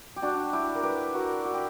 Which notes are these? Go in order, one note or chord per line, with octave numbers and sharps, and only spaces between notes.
G4
D4 F#4
E4 G4
A#4
G4 B4
F#4 A#4
F#4
G4